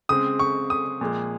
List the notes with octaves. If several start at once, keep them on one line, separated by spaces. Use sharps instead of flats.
C#3 G#3 C4 D#6
C#6
D#6
A#2 F3 G#3